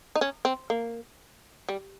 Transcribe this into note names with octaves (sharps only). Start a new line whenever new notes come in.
D#4
C#4
C4
A#3
G3